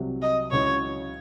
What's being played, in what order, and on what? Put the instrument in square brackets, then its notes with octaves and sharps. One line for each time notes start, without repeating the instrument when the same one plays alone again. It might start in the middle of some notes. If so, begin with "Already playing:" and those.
Already playing: [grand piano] C2 C3 F#3
[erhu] D#5
[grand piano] C#2 C#3 F#3 C#4 E4 [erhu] C#5